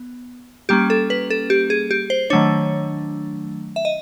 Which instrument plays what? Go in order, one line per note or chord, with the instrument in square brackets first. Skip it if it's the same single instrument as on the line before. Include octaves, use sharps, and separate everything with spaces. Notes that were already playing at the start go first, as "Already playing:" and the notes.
Already playing: [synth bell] B3
G3 A#3 C#4 G4
A4
B4
A4
G4
G#4
G4
C5
D#3 F#3 A3 D4 C#5
E5
D#5